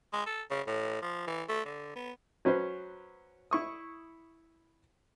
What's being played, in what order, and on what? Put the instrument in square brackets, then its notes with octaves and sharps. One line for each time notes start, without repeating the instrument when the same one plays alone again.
[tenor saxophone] G#3
A4
C#3
A2
F3
E3
A3
D3
B3
[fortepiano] F#3 C#4 B4 C5
E4 C#6 D#6